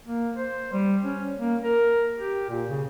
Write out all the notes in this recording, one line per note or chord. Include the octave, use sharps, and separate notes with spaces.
A#3
C5
G3
C#4
A#3
A#4
G4
A#2
C#3